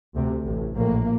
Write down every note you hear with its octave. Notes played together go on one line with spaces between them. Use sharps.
D2 C3
A1 A2
A#1 A2 A#3